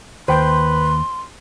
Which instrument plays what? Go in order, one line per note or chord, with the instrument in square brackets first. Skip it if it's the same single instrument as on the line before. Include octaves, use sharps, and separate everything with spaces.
[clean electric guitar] D#2 [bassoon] B4 [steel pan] C5 G5 [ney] C6